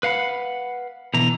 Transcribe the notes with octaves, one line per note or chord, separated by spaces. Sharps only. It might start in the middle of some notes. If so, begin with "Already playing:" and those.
B4 F5 F#5 B5
B2 D3 E3 A#5